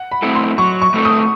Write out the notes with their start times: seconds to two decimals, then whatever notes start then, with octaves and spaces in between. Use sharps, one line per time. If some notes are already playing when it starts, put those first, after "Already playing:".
Already playing: F#5
0.12 B5
0.22 A3 C4 E4 A4
0.35 C6
0.58 F#3 C#6
0.82 C#6
0.94 A3 C4 E4 A4
1.05 D#6